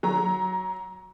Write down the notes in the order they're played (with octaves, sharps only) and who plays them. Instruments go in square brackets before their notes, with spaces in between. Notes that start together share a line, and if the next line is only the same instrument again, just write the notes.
[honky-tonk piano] F#3 A#5